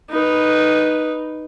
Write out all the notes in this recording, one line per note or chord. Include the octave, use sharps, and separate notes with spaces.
D#4 B4